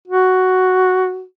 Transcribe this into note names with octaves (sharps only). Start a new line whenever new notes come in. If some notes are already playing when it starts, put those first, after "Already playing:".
F#4